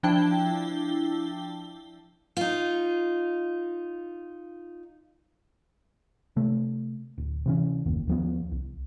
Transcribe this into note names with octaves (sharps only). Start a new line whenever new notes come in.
F3 D4 E4 G5 A5 G7
D#4 F4
C3 A3
D1
C3 E3 C#4
F#1 D#2
D#2 F3 B3
C2